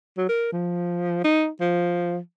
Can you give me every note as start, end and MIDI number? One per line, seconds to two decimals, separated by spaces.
0.18 0.29 54
0.29 0.50 70
0.52 1.20 53
1.25 1.48 63
1.60 2.18 53